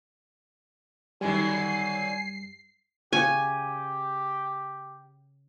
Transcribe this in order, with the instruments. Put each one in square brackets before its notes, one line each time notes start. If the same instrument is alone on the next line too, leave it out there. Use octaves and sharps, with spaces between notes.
[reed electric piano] F#2 G3 [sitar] D3 D#3 F#3 [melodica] G#5 [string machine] C7
[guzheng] C#3 C#5 [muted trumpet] G4 [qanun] G#5